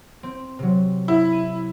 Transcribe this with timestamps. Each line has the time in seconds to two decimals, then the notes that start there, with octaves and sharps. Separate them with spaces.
0.23 C4
0.59 C3 F#3
1.08 E4
1.32 D#7